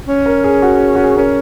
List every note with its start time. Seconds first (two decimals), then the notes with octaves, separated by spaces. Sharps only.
0.08 C#4
0.26 A#4
0.44 G#4
0.62 F#4
0.76 G#4
0.95 F#4
1.04 G#4
1.17 C#4 A#4